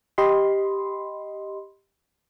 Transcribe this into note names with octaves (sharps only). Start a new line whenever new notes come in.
G4 D#5 B5 C6